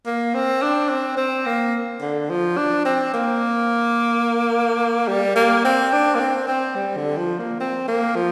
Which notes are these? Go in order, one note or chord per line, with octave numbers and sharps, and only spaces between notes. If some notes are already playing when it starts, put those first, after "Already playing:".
A#3
C4
D4
C4
C4
A#3
D3
F3
D4
C4
A#3
G3
A#3
C4
D4
A#3
C4
C4
G3
D3
F3
A#3
C4
A#3
F3